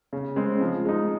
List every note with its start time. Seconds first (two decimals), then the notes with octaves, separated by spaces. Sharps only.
0.13 C#3
0.36 G#3 C4
0.61 F3
0.85 G#3 D#4